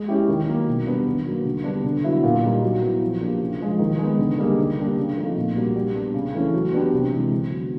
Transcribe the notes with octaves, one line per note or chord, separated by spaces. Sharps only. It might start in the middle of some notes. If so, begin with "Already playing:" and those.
Already playing: G#3
C#4 E4 G4
D#3
F#3 A#3
B2
G3 B3 D4
D#3
F#3 A#3
D3
G3 B3 D4
D3
F#3 B3 E4
A#2
G3 A#3 D#4
F#3
B3 E4
F3
A#3 D4 G4
C#3
F3 G#3
D#3
G#3
B3
D3
G3 A#3 D#4 G#4
D3
G3 A#3 D4 G4
C#3
F3 A3 C4 D#4
A#2
G3 A#3 D4 F#4
G3
B3 D4
C#3
E3 A3 C#4
F#3
B3 D4 G4
C3
E3 G#3
D3
F#3 B3